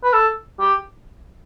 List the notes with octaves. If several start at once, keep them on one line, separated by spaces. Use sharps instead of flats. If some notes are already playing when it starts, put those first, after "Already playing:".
B4
A4
G4